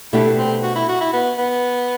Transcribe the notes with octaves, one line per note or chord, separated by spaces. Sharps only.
B2 A3 D4 E4 G4
C4
F#4
E4
F#4
E4
B3
B3